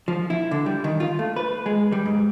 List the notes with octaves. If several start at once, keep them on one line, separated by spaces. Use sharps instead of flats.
F3
E4
D3
G3
D#3
F4
A3
B4
G#3
G3
G#2